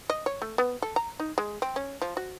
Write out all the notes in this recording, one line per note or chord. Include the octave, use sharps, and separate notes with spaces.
D#5
C#5
A3
B3
A4
A#5
D#4
G#3
C4
C#4
F3
F#4